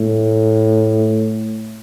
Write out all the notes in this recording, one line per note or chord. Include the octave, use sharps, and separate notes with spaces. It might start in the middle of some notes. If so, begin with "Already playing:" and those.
Already playing: A2